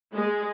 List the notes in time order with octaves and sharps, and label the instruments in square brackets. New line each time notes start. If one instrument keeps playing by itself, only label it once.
[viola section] G#3